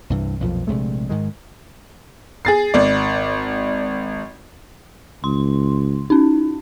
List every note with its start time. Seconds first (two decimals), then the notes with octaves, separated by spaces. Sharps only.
0.10 C2 G2 E3
0.41 B1 F2 A#2 F3
0.67 A#1 C3 G#3 A3
1.09 G#2 D#3 G#3
2.45 G#4 A6 C7
2.74 G#1 D5
5.24 C#2 C6
6.10 C#4 D#4